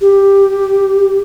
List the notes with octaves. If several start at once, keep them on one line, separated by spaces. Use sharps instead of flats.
G4